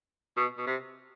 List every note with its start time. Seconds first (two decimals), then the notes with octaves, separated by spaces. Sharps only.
0.37 B2
0.58 B2
0.67 C3